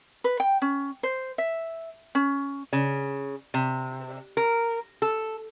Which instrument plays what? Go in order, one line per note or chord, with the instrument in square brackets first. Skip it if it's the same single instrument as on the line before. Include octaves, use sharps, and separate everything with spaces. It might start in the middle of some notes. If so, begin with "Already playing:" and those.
[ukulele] B4
G5
C#4
C5
E5
C#4
[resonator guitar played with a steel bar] C#3
C3
A#4
A4